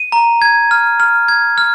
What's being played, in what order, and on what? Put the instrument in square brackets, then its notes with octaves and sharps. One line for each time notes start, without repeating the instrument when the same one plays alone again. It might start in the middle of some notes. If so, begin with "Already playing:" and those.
Already playing: [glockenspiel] D#7
A#5
G#6
F6
F6
G#6
F6